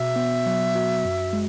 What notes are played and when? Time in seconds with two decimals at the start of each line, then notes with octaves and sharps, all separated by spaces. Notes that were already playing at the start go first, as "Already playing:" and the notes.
Already playing: B2 F#4 E5
0.16 B3
0.46 F#3
0.75 F#4
1.05 F#2
1.33 G#3